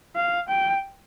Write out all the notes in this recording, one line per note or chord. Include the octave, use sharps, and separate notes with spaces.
F5
G5